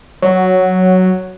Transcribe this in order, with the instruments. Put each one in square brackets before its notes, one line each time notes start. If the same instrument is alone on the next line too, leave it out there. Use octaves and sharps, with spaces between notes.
[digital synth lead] F#3